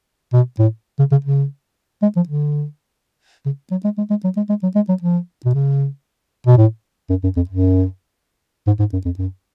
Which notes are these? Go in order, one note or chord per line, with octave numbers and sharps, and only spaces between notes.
B2
A2
C#3
C#3
C#3
G#3
F3
D3
C#3
F#3
G#3
G#3
G#3
F#3
G#3
G#3
F#3
G#3
F#3
F3
B2
C#3
B2
A2
F#2
F#2
F2
F#2
G#2
G#2
F#2
F2
F#2